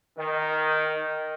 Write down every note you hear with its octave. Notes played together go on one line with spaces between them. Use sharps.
D#3